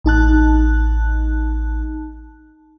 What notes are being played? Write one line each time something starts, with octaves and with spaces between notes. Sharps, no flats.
A1 D#4 A5 F#6